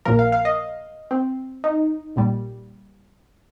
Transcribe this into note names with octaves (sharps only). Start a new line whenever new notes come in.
A#1 A#2 F3 A#4
F5
F5
D#5
C4
D#4
A#1 A#2 G3